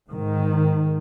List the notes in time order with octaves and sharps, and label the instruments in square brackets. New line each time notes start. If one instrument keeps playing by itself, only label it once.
[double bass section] G#2 D#3